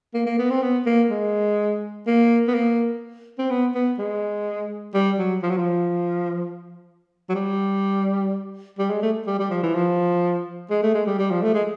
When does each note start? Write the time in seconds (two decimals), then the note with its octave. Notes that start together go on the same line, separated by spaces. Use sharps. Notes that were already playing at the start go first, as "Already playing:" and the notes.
0.14 A#3
0.26 A#3
0.39 B3
0.50 C4
0.62 B3
0.86 A#3
1.10 G#3
2.07 A#3
2.48 B3
2.54 A#3
3.39 C4
3.50 B3
3.75 B3
3.98 G#3
4.94 G3
5.18 F#3
5.43 F3
5.50 F#3
5.58 F3
7.29 F#3
7.35 G3
8.78 G3
8.90 G#3
9.02 A3
9.26 G3
9.39 G3
9.50 F3
9.63 E3
9.74 F3
10.70 G#3
10.83 A3
10.94 G#3
11.06 G3
11.19 G3
11.31 F3
11.42 A3
11.54 G#3